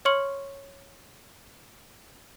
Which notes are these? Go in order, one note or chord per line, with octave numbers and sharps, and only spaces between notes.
C#5 C6 C#6 F6 C#7 F#7